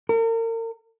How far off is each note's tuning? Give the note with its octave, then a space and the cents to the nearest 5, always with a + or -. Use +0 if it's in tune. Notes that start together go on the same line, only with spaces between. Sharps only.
A#4 -40